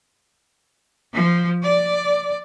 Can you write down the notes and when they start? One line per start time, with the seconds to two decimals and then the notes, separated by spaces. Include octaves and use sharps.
1.13 F3
1.63 D5